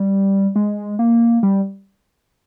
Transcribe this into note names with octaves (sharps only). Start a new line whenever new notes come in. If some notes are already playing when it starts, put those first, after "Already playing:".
Already playing: G3
G#3
A#3
G3